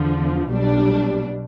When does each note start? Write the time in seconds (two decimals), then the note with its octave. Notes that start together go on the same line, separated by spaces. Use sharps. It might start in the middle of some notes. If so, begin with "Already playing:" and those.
Already playing: E2 D3 F3
0.49 B1 B2 G3 D4